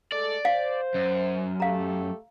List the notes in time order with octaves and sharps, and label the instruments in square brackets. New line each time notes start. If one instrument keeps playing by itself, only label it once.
[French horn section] G#3 A3 A4 [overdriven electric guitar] D5
[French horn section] C5 [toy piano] F5
[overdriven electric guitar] F#2
[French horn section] A3 G4 [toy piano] F5 A#5